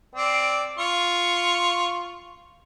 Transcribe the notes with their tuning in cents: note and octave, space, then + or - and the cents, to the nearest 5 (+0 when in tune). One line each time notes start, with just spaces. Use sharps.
C4 +0 D5 -5
F4 +0 C#6 +0